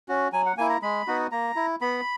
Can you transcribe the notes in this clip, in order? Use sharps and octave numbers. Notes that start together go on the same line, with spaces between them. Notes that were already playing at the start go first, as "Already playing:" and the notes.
C#4 F#4
F#3 G#5
F#5
A#3 E4 G#5
A#5
G#3 B5
B3 D#4 F#4
A#3 A#5
E4
B3 B5